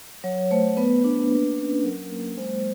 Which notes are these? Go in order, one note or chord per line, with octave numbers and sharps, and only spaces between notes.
F#3 C#5
A3 C5
B3 B4
D4
A#3
C#4
F#3 A#4
A#3
G#3 C5